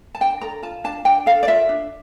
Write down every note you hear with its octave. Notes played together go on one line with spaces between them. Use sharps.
A5
D4 G5
A4 A#5
F4 A5
D4 A5
D4 G5
A4 F5
D5
F4 E5
D4